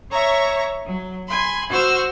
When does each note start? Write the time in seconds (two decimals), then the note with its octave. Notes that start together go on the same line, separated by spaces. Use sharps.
0.11 C#5 E5 A#5 C#6
0.85 F#3
1.28 G#5 B5 C6
1.70 F#4 C5 E6 F6